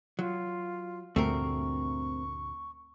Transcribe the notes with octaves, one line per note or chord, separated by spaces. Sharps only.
F#3 F4
D2 G2 A#2 A3 C4 A#4 C#6